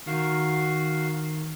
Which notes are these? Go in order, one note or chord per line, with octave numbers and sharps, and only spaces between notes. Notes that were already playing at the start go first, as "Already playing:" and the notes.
D#3 F#4 F5